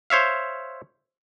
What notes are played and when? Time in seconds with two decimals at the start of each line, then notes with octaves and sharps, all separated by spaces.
0.10 C5 C#5 E5 F5